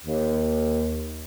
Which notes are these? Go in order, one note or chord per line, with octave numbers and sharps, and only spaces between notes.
D#2